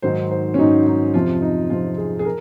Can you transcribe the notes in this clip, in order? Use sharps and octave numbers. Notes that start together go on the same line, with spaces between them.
G#2 D#3 F#3 C5
C5
C#4
G#2 D#3 F#3 D#4
D#4
F2 C3 F3 F4
D#4
F2 C3 F3 F4
G#4
G#4
A#4